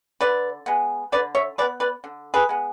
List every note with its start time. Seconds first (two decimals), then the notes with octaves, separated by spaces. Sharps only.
0.21 D3 B4 D5
0.66 G#3 B3
1.12 D3 B4 D5
1.35 C#5 E5
1.58 G#3 B4 D5
1.62 B3
1.80 B4 D5
2.04 D3
2.34 G#4 B4
2.49 G#3 B3